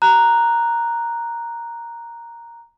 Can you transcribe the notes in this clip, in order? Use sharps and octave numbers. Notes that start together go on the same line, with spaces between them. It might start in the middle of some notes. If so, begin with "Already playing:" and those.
A#5 F#6